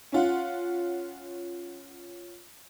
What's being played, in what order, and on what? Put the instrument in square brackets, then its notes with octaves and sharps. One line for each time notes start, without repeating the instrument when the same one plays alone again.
[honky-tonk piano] C#4 F4 F#5